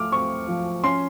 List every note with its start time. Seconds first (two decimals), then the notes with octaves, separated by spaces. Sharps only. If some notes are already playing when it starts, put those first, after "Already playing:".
Already playing: F3 A3 D6 F6
0.12 C4 C#6
0.48 F3
0.84 C#4 C6